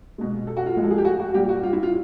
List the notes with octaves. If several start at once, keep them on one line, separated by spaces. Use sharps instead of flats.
B2 G#3
A4
F#4
F4
A2 F3 G#3
A4
G#4
G4
F#4
F#4
A#2 G3 G4
F#4
F4
E4
F4